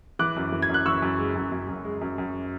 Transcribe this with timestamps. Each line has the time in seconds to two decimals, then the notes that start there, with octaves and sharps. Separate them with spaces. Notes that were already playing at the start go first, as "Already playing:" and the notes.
0.19 E3 D6 F#6
0.36 F#2
0.52 E3
0.62 G#6
0.69 F#2 F#6
0.85 E3 C#6 E6
1.02 F#2
1.19 G#3
1.35 F#2
1.52 F#2
1.68 F#2
1.85 G#3
2.01 F#2
2.18 F#2